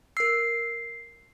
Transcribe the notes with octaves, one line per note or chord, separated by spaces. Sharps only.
A#4 E6 C7